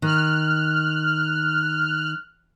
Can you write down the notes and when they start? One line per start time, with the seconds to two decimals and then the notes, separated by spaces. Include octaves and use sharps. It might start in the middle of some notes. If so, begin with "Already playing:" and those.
0.02 D#3 F6 F#6